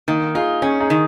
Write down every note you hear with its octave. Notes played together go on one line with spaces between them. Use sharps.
D#3 A#3
D#4 F4 G#4
C#4 D#4 G#4
D#4 G#4
D#3